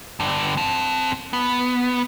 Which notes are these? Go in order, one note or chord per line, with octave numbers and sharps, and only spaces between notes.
G2 D3
C4 A5
B3